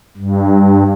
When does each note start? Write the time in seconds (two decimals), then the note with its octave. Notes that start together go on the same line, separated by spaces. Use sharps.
0.17 G2